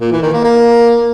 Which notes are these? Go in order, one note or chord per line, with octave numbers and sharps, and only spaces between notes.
A#2
E3
D#3
A#3
A#3